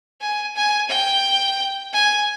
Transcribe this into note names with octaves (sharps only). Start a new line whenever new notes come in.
G#5
G#5
G5
G#5